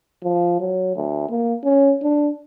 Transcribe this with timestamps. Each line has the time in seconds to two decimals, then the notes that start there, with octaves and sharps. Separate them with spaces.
0.23 F3
0.60 F#3
0.96 D2
1.30 A#3
1.64 C#4
2.02 D4